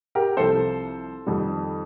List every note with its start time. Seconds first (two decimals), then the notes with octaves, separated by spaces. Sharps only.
0.15 G4 A#4
0.37 C2 C3 F3 A4 C5
1.26 F2 D#3 G3